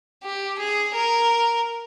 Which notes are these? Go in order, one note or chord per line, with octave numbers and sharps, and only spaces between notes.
G4
G#4
A#4